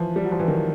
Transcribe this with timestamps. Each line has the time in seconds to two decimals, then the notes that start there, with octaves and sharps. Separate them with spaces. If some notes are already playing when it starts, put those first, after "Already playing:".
Already playing: E3 F3
0.16 G3
0.25 F#3
0.32 F3
0.39 E3
0.48 D#3